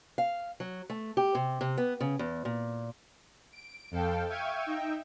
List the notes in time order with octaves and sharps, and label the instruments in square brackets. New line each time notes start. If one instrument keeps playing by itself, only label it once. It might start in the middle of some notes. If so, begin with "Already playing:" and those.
[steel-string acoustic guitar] F5
F#3
A3
G4
C3
C3
B3
C#3
E2
A#2
[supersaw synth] D7
F2 A4 F5 G5
E5 F5 G5 C#6 G#6 D#7
D#4 E5 G5